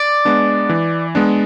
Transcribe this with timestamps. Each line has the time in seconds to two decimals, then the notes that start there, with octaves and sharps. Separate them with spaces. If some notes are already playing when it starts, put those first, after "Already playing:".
Already playing: D5
0.25 G#3 B3 D4
0.69 E3
1.15 G#3 B3 D4